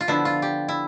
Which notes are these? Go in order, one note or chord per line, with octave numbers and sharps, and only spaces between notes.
F4
D3 F3 B3 D4 E4
F4
G4
E4